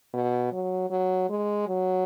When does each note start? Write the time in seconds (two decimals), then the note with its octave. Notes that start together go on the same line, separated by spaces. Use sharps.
0.14 B2
0.52 F#3
0.90 F#3
1.29 G#3
1.68 F#3